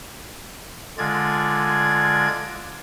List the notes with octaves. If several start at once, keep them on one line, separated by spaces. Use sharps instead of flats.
D3 G#3 F4 D5 G#6